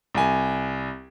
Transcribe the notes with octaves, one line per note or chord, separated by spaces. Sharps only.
C2 G#5